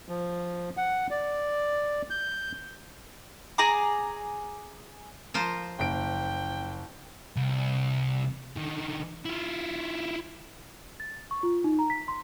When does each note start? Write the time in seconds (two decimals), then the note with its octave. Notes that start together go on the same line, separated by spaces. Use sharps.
0.09 F3
0.77 F#5
1.11 D5
2.10 G6
3.58 G#4 G#5 A#5 D6
5.34 F3 A#4 C5
5.79 F#1 G5 D7
7.36 C2
8.56 D3 D#3
9.25 E4 F4
11.00 A6
11.31 C#6
11.43 F4
11.64 D#4
11.79 A#5
11.90 B6
12.08 C6